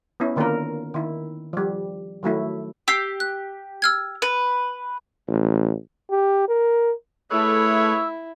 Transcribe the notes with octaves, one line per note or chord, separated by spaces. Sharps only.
B3 C#4 E4
D3 D#3 A#3 D4 F4 A#4
D#3 E4
F3 G3
D#3 F#3 A3 E4
G4 E6 B6 C7
F#6
E6 F6 G#6
B4
A1
G4
A#4
A3 E4 G#4 B4 C#5 E6